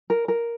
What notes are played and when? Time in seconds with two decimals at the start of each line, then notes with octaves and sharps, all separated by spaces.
0.10 A#4
0.28 A#4